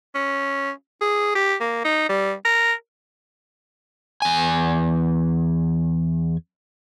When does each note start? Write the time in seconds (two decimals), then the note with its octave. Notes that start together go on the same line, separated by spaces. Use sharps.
0.15 C#4
1.01 G#4
1.35 G4
1.60 A#3
1.85 D#4
2.09 G3
2.45 A#4
4.22 E2 G#5